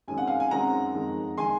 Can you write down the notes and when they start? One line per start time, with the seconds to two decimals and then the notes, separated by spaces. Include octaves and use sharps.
0.08 F#2 D#3 G#3 C4 G#5
0.18 F#5
0.27 F5 G#5
0.40 G#5
0.51 F#2 D#3 G#3 C4 F#5 A#5
0.94 F2 D#3 G#3
1.38 D#3 G#3 G#5 C6